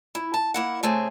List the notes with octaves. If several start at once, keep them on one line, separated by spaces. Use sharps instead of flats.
E4
A5
A#3 E4 F#5
C#3 A3 C4 G#4